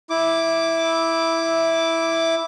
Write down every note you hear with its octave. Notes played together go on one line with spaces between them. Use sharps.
E4 D6